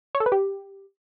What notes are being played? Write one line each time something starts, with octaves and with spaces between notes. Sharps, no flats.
C#5
A4
B4
G4